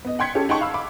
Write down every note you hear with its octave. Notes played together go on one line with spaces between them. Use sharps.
B3 D#5
F#5 G5 C6 G#6 B6 C#7
C#4 G4 A4
D#4 F#5 G5 A5 C6 C#6
F5 B5 E6
B5 D6